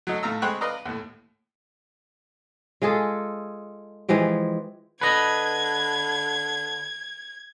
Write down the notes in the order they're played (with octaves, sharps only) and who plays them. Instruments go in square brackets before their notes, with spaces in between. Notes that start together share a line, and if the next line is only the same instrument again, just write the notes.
[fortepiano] F#3 A3 D#4 A4
A2 A3 F5 A#5 E6
G#3 C4 G5 B5 C#6 F#6
B4 D5 D#5 F5 A#5
D#2 A2
[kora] G#3 F4 G#4 A4
E3 F3 G#3 G4
[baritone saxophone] D3 [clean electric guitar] B4 D#5 [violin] G#6